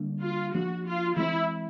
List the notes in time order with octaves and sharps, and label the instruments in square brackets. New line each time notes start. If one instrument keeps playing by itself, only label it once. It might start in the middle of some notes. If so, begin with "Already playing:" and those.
Already playing: [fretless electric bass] D3 G3 A#3 D4
[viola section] F4
[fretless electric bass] F3 A#3 D4 [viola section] F#4
[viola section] F4
[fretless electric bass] E3 G#3 C4 [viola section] E4